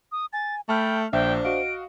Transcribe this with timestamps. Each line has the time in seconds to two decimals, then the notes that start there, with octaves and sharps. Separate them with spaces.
0.12 D#6
0.33 G#5 A6
0.69 A3 G5 A5 B5 F6
1.13 A#1 D4 C5 E5 G5
1.45 F#4 D#5 F5 D7